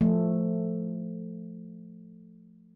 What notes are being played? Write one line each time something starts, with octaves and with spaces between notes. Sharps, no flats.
F3 A3